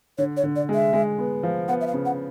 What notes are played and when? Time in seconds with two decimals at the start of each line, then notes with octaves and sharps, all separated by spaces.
0.18 D3 C#5
0.37 C#5
0.43 D3
0.56 D5
0.69 G#3
0.74 E5
0.93 G#3
1.18 B3
1.43 F3
1.68 B3 F#5
1.81 E5
1.87 F5
1.93 C#3
2.05 F#5